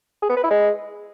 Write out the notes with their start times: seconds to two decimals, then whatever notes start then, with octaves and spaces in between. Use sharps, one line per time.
0.23 G#4
0.30 B3
0.37 B4
0.44 E4
0.51 G#3